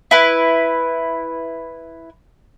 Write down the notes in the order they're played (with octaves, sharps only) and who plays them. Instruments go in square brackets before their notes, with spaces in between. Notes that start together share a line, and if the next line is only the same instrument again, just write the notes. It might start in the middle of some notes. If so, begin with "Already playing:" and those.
[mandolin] E4 B4